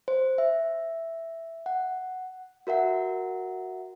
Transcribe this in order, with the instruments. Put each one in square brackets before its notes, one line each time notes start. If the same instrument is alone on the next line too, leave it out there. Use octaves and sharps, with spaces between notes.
[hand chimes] C5
E5
F#5
F#4 A#4 E5 F#5